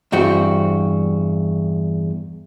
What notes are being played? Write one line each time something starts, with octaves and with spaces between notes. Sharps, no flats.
E2 G2 C4 F#4 G5